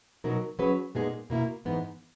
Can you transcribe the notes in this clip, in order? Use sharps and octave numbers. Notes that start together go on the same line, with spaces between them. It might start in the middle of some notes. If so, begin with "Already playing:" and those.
B2 F#3 B3 D#4 A#4
F#3 C#4 G#4 B4
A#2 G#3 B3 D#4 G#4
B2 A#3 E4
G#2 E3 B3 D#4